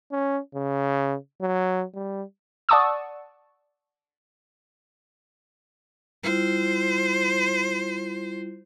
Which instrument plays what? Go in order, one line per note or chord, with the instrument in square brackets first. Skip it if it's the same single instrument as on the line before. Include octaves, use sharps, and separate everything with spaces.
[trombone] C#4
C#3
F#3
G3
[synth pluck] D5 F#5 A5 C#6 D#6 E6
[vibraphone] G3 E4 F4 [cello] C5